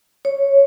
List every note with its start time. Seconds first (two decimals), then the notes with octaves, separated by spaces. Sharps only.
0.25 C#5